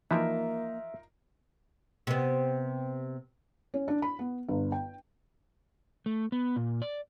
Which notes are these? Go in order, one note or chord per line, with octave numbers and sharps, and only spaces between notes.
E3 F3 A#3 D#4 F4 A#4 E5
C3 B3
C#4
D4
B5
B3
G1
G5
A3
B3
A#2
D5